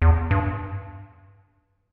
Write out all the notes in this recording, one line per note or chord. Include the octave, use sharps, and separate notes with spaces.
E2
G2